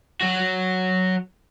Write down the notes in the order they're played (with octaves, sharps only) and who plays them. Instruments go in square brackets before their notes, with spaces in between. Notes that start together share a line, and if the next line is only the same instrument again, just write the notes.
[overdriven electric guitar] F#3 F#4